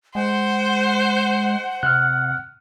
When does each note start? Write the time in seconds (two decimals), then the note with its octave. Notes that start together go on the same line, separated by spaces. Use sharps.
0.15 G#3 C5 F#5
1.83 C3 F6 F#6